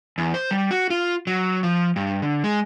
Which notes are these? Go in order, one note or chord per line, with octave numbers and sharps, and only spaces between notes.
E2
C5
G3
F#4
F4
F#3
F3
G2
D3
G#3